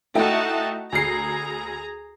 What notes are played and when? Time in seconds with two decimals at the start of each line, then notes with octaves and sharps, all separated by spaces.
0.15 A3 D#4 E4 F#4 G5 A5
0.92 D2 G#4 A#5 C7